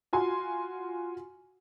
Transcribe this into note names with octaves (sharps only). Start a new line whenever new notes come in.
F4 F#4 G#5 C6